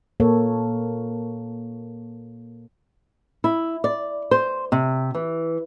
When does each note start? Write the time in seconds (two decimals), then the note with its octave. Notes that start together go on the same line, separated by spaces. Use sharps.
0.20 A#2 A#3 A4 C#5
3.44 E4
3.84 D5
4.31 C5
4.72 C3
5.15 E3